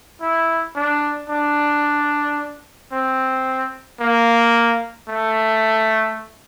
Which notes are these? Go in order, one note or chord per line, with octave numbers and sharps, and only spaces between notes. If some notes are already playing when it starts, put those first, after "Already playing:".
E4
D4
D4
C4
A#3
A3